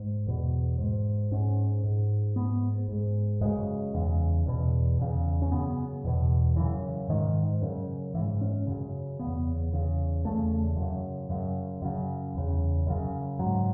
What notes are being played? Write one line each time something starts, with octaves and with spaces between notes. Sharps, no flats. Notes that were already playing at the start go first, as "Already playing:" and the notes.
Already playing: G#2
E2 B2
G#2
G#2 C#4
G#2
G#2 B3
G#2
F#2 C#3 G#3
E2 C#3
E2 B2
E2 C#3
C#4
F#2 C#3 B3
E2 B2
F#2 C#3 E3
G#2 D#3
F#2 C#3
G#2 E3
C#4
F#2 C#3
E2 C#3 B3
E2 C#3
E2 C#3 A3
F#2 C#3
F#2 C#3
F#2 C#3
E2 C#3
F#2 C#3
G#2 F#3